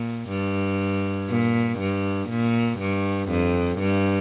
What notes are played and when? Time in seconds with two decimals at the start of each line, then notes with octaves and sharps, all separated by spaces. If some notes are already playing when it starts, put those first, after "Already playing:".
Already playing: A#2
0.29 G2
1.29 A#2
1.79 G2
2.29 A#2
2.79 G2
3.30 F2
3.79 G2